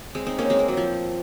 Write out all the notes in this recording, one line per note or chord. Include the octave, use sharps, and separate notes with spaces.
G#3 C4
C4 D#4
A#3 C#4
G#3 C4
A#3
F#3
F3